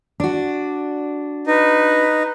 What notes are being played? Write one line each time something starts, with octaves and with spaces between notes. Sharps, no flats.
D4 F#4
D#4 B4